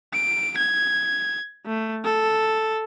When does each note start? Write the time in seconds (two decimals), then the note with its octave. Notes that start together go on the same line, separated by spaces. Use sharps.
0.14 D7
0.57 G#6
1.66 A3
2.05 A4